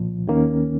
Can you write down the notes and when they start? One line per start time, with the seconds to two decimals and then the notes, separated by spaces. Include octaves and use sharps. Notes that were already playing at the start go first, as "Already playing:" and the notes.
Already playing: C2 A#2 F3
0.27 D#2 D#3 A#3 C#4